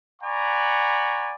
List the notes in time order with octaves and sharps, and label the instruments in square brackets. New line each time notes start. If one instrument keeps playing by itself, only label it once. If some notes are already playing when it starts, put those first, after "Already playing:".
[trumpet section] D5 F#5 G#5 A#5 B5 C#6